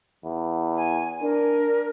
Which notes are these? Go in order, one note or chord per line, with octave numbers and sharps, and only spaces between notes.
E2
G#5
D4 A#4